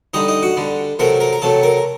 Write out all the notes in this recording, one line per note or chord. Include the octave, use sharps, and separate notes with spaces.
D3 G3 D#4 D#5
D#4 D#5
F#4 F#5
D3 G3
C3 F#3 A3 A#4 A#5
A#4 A#5
A#5
C3 F#3 A3 A4 A5
A#4 A#5